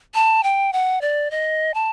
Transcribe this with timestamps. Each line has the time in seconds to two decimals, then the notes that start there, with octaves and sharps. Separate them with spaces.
0.15 A5
0.43 G5
0.73 F#5
1.01 D5
1.31 D#5
1.74 A5